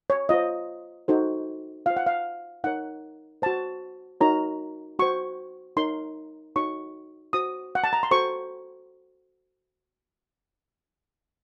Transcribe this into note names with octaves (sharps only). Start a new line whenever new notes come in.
C#5
F4 C5 D#5
D#4 F#4 A4 C5
F4 C5 F5
F#5
F5
D#4 A#4 C#5 F#5
F#4 C5 A5
D#4 F#4 A#4 C#5 A#5
F#4 C5 C#6
D#4 A#4 C#5 C6
D#4 F#4 A4 C#5 C#6
F#4 C5 D#6
F#5
A5
A#5
C6
F#4 A4 C5 C#6